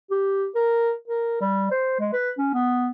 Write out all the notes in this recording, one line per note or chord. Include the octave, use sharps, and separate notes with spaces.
G4
A#4
A#4
G3
C5
G#3
B4
C#4
B3